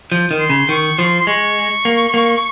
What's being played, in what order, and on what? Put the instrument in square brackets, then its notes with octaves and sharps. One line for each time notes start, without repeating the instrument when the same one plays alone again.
[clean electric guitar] F3
D#3
[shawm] C6
[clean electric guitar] C#3
[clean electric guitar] D#3 [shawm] C#6
[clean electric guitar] F3 [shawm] C6
[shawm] C6
[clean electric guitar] G#3 [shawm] C#6
[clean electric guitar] A#3
A#3